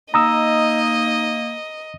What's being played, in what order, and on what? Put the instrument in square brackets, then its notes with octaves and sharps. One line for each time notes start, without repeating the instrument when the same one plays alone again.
[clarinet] A#3 [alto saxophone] D#4 [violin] D#5 [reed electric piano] A#5 D#6 E6